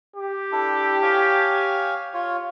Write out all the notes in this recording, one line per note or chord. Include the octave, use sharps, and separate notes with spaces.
G4
D4 E4 A4
C#5 F5 G#5
F4 C#5